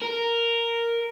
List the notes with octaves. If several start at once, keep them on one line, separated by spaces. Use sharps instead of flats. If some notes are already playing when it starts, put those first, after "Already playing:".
A#4